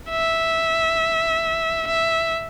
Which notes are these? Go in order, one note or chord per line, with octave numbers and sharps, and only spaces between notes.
E5
E5